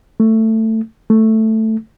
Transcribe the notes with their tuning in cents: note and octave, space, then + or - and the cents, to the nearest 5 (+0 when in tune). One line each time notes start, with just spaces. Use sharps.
A3 +15
A3 +5